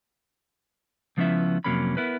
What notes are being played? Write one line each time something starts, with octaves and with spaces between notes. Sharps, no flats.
C#2 F3 B3 C#4 E4 E5
F2 C3 F#3 A#3 C#4 B5
B3 E4 A#4 B4